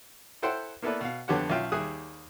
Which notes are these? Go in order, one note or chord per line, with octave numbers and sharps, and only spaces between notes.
E4 A4 C5 F#5 G5 C6
A#3 B3 E4 A4 B4 D5
B2 F5
F2 D3 B3 G4 C#5 F#5
B1 C#4 F4 E5 G5
D#2 G3 G#4 E5 D#6 F#6